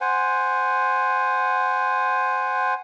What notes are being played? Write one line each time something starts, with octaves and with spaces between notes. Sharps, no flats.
C5 F#5 G#5